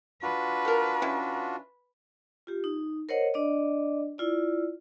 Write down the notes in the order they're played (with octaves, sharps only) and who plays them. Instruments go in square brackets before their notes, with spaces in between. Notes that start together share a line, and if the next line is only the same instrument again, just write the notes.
[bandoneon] D4 F4 F#4 [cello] B4
[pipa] A4 A#4
E3 C#4 E4
[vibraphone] F4 G4
D#4
A#4 C5 C#5 D#5 F#5
D4 D5 D#5
E4 F4 D5